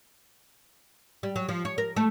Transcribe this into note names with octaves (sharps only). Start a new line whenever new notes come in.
G3
F#3
F3
C#5
A#4
A3